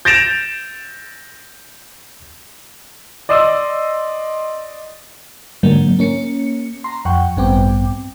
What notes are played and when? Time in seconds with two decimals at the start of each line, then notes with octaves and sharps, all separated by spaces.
0.05 G6 A6 A#6 D7 E7 F7
3.29 D5 D#5 C6 D#6 E6
5.63 G#2 D3 F#3 A#3
5.99 A#3 C#4 C#7
6.84 A#5 C6
7.05 F2 F#5 G5 C#6
7.36 A1 G2 B3 C4 G5 D6